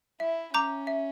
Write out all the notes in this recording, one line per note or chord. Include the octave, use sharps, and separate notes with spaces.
E4 E5
C#4 A#5 D6 G6
E5